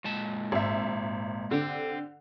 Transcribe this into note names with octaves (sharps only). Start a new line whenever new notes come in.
A#2 G#3 A5
G#1 E5
D3 C4 G4